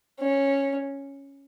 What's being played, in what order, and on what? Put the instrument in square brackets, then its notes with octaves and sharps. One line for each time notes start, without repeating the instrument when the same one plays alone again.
[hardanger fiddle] C#4